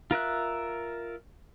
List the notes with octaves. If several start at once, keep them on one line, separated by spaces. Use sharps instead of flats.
F4 A#4 E5 F#6